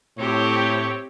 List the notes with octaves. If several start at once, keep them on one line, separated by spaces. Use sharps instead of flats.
A2 C4 G4 C#5